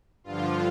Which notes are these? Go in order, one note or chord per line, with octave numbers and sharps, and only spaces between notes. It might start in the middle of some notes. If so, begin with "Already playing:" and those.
G2 D3 F3 F4